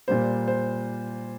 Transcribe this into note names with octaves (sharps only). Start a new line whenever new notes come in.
A#2 G3 A#3 C5
C5